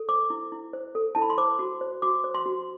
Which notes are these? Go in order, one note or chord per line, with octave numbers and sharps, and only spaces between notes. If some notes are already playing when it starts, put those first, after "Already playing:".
Already playing: A4
C5 D6
E4
E4
C5
A4
E4 A5
B5
C6
C5 D6
F#4
C5
F#4 D6
C5
C6
F#4